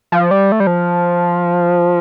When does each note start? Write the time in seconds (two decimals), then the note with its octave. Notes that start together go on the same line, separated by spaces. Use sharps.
0.12 F3
0.31 G3
0.52 A3
0.60 G3
0.67 F3